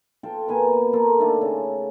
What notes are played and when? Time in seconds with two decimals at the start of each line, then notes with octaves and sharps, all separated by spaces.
0.23 F4 A4 G5 A5
0.48 B2 A#3 B4 G#5
0.93 A#3 F4 A4 A#4
1.19 D3 D#3 A3 D4
1.41 C#3